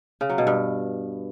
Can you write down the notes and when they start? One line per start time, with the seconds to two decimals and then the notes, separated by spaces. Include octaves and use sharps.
0.21 C#3
0.29 F#3
0.38 B2
0.47 G2